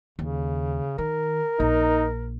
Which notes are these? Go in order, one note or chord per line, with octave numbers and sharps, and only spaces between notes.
D#2 C#3
D#3 A#4
A#1 D#4